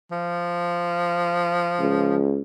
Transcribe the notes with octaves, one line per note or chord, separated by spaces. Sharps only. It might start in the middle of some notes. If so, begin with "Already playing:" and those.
F3
C#2